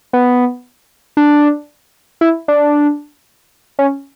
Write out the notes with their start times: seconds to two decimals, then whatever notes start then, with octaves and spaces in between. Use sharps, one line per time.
0.13 B3
1.17 D4
2.21 E4
2.48 D4
3.79 C#4